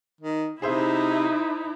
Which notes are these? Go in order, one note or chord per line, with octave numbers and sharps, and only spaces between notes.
D#3
C3 D#4 E4 G#4 C5 E5